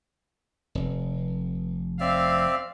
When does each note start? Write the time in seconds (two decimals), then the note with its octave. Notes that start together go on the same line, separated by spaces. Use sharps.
0.75 F1
2.00 C4 D5 E5 F5